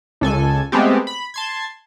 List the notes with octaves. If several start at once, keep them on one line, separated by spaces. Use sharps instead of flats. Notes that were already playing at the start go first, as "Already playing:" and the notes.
C#2 A4 G#5
G#3 A3 B3 C4 G4
B5
A5 C6 G#6